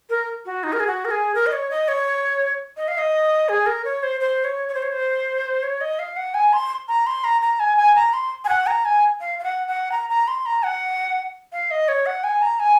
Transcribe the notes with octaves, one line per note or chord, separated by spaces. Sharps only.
A#4
F#4
D#4
A#4
G#4
F#4
A#4
G#4
A#4
D#5
C#5
D#5
C#5
D#5
F5
D#5
G#4
A#4
C#5
C5
C5
C#5
C#5
C5
C#5
C5
C#5
D#5
F5
F#5
G#5
C6
A#5
C6
A#5
A#5
G#5
G#5
A#5
C6
G#5
F#5
A#5
G#5
F5
F5
F#5
F#5
A#5
A#5
C6
A#5
F#5
F5
D#5
C#5
F#5
G#5
A#5
G#5